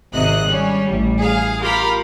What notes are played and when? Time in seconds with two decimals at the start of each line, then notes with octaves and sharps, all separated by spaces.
0.13 G#1 C3 D#5 F#6
0.46 G3 C#4
0.85 A1 G3
1.18 G#4 F5
1.61 F4 G4 A#4 F5 A#5 B5